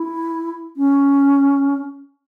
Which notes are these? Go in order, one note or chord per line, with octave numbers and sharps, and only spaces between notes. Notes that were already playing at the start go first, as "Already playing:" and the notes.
Already playing: E4
C#4